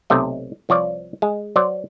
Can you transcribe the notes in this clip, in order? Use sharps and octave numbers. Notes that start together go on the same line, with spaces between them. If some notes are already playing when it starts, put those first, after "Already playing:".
B1 C3 A3 D#5
C2 F3 C#5 D5
G#3
F#3 C5 D5